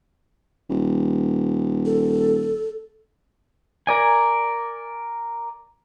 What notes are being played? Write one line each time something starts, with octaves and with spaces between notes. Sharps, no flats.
D#1
A4
A#4 D5 G#5